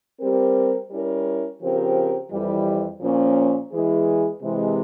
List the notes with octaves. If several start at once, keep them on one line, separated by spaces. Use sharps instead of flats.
G3 C4 G4 A#4
G3 C#4 E4 A#4
C#3 F3 C4 G4 A#4
F2 E3 G3
A#2 F3 A#3 C#4
E2 E3 G#3 E4 G#4
C3 E3 G#3